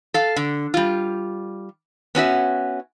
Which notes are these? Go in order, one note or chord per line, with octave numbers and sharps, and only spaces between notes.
A4 F5
D3
G3 F4
B3 C#4 F#4 E5